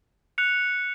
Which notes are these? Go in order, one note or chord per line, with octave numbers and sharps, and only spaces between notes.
F#6 C#7 F7